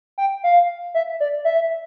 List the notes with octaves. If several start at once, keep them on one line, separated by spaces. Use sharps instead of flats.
G5
F5
E5
D5
E5